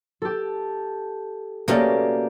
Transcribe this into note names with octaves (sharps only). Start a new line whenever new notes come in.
G4 A4
B2 A3 A#3 C#4 G4 D5